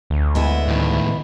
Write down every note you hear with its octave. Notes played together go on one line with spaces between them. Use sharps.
D2
G#3 B3 E4
A2 D#3